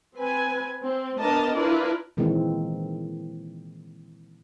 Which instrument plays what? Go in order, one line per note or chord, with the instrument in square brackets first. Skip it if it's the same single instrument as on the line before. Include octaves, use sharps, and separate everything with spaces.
[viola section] C4 B4 G#5
C4
B3 D4 A#4 B4 D#5 A5
D4 E4 F4 A#4 B4 D5
[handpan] A#2 D#3 E3 G#3 A#3 C4